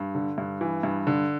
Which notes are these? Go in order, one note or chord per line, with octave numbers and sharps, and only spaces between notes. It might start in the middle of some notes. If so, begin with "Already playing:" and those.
Already playing: G2
D3
G2
E3
G2
D3